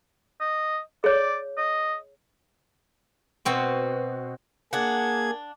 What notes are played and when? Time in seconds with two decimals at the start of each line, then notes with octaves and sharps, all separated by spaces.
0.40 D#5
1.04 G#4 C#5 D5
1.57 D#5
3.45 B2 C4 F#4
4.73 A#3 D4 G#4 F#5 G#6